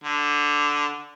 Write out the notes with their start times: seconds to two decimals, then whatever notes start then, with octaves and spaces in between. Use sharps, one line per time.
0.04 D3